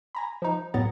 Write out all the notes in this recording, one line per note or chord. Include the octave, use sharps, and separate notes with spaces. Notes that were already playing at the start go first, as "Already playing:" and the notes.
G#5 A#5 B5
F3 D#4
A2 F#3 B3 A#5 A6